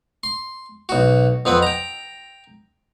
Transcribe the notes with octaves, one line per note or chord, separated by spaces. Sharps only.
C6
B1 F#4
F2 B3 C4 B4
G5 A#5